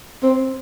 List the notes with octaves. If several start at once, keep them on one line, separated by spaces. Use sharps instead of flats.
C4